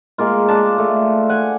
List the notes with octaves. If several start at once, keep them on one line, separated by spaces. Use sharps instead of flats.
G#3 A#3 F4
D4 A5
A3
F#5 G#5